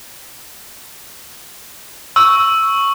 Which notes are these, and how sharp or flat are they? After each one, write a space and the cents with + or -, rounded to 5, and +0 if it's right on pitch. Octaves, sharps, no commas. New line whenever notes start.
C#6 +0 E6 +0